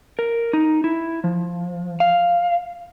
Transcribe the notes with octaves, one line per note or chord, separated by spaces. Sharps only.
A#4
D#4
E4
F3
F5